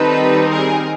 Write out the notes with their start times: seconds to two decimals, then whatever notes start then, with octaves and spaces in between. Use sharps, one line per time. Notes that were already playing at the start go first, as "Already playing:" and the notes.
Already playing: D#3 G3 C4 D#4 A4 B4
0.50 G#4 A#4